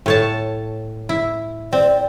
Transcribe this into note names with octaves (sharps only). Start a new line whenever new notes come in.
A2 C#5 A5
E4
C4 D5